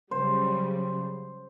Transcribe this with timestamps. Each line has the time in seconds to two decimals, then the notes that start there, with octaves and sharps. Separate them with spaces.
0.11 C#3 F#3 G3 C5